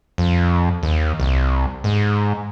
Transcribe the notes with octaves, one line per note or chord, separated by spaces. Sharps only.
F2
D#2
C2
G#2